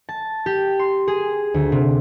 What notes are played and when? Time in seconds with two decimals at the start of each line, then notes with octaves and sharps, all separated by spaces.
0.09 A5
0.46 G4
0.79 C6
1.08 G#4
1.54 D2
1.72 C3